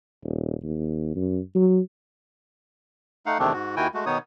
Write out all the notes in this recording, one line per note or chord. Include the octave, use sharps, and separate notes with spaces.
D#1
D#2
F#2
F#3
A3 D#4 F5 F#5
E2 C3 D#3 A3 C4 D4
G#2 F#4
D#2 D#3 E4 F#4 G5 G#5
G#3 A3 F#4
B2 D#3 B3 D#4 C#5 D#6